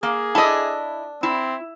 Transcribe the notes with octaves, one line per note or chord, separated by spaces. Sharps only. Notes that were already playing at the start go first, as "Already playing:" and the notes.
A#3 G#4
D4 E4 A4 D#5
C4 E4